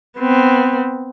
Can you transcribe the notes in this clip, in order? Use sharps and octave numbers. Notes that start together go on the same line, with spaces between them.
B3 C4